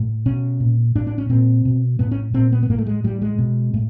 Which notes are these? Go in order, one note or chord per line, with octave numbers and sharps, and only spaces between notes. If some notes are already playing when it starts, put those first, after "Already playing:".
Already playing: A2
B2 C#4
A#2
A2 D4
D4
C#4
A#2 C4
B2
A2 B3
C#4
A#2 C4
B3
B3
A2 A#3
A3
G#3
A2 G3
G#3
B2
A2